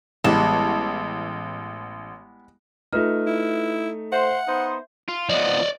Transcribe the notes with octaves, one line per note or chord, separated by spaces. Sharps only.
A1 G3 G#3 B3 A5
A3 D#4 F4 B4 F6
E4
C5 E5 F#5
B3 D#4 C5
F4
F3 B3 D5 D#5